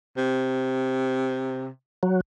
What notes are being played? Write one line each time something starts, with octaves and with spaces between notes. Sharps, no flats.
C3
F#3